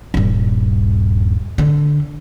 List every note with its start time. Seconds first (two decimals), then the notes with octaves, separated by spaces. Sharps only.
0.14 D#1 G2
1.58 D3